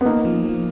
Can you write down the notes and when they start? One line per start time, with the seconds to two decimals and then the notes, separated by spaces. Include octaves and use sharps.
0.01 B3
0.05 A#3 D#4
0.25 F3
0.44 F3